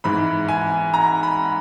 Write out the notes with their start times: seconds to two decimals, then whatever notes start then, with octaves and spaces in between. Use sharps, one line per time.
0.04 G#2 E3 B5
0.49 G#5
0.94 A#5
1.23 B5